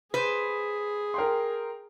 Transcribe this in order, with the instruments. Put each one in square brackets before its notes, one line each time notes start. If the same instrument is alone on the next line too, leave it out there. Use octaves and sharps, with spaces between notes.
[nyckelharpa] G#4 [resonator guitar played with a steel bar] B4 C5
[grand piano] A#4 G5 C6